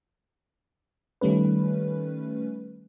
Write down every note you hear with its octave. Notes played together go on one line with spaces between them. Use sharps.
D#3 G3 A3 C#4 B4